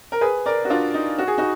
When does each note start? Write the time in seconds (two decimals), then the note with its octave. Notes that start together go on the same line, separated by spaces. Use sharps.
0.12 A#4
0.21 G#4 B4
0.46 A#4 D5
0.65 F#4
0.70 D4 F4
0.94 D#4
1.18 F#4
1.27 G#4
1.38 D#4 F#4